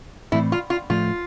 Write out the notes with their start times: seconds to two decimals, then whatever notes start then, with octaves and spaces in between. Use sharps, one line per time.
0.32 A2 E3 A3 C4 E4
0.52 F4
0.70 F4
0.90 A2 F3 A3 F4